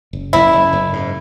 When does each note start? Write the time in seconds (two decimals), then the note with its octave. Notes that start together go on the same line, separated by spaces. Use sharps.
0.13 F#1
0.33 F#1 E4
0.53 F#1
0.73 F#1
0.93 G#2